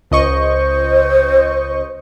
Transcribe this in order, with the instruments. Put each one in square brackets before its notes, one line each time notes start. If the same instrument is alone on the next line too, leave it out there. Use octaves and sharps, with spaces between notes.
[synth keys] C#2 D#5 C#6 [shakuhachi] C5